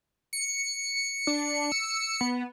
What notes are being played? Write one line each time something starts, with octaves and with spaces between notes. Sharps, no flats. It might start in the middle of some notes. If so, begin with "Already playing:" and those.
C#7
D4
E6
B3